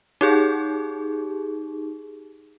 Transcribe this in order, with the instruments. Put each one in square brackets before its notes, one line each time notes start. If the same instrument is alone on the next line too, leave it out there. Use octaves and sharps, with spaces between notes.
[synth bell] D#4 G4 G#4